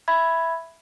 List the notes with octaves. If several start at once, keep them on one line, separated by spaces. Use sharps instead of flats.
E5 B5 G#6